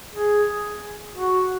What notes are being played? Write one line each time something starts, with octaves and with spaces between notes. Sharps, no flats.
G#4
F#4